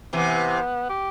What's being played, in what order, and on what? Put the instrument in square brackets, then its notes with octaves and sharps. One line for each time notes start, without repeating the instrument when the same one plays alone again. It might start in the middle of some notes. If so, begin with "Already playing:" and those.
[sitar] C3 E3 [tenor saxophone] B3
[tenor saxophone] G4